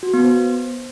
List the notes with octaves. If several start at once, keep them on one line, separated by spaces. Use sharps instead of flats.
F#4
B3
C5